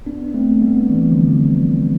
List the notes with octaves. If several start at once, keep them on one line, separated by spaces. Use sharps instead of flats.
B3 D4
A3 C4
G3 B3
E3 G3
D3 F3